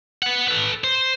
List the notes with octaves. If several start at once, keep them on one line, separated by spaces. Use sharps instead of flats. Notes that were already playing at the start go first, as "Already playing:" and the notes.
B3 F#5
A4 B4
C5